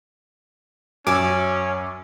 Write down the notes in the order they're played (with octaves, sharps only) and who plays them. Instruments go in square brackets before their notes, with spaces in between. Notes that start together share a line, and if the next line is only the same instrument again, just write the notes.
[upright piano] F#2 [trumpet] C#4 [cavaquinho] D5 E5 G#5 [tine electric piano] D6